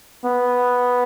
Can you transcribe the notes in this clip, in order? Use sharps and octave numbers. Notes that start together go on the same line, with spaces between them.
B3